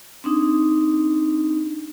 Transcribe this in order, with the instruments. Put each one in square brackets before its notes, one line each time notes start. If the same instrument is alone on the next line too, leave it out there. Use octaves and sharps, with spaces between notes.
[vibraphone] C4 D4 D#4